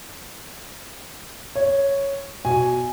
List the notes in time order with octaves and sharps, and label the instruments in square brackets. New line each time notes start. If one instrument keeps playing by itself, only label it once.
[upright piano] C#5
[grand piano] B2 [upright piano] G#5